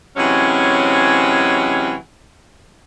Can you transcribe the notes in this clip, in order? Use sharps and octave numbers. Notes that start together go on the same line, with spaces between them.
C3 E3 F#3 G#3 C4 C#4